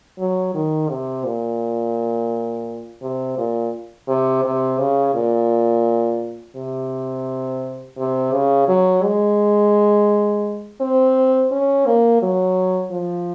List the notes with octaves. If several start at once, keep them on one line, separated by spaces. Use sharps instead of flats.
F#3
D#3
C3
A#2
C3
A#2
C3
C3
C#3
A#2
C3
C3
C#3
F#3
G#3
C4
C#4
A#3
F#3
F3